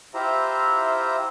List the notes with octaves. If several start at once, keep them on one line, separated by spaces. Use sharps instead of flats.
E4 F4 G4 C5 E5 A#5